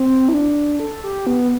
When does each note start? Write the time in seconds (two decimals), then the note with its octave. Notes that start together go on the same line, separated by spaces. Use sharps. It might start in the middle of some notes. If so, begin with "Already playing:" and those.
Already playing: C4
0.29 E4
0.33 D4
0.80 A4
1.04 G4
1.27 B3